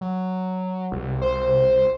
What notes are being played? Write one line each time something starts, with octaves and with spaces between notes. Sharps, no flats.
F#3
C2
C5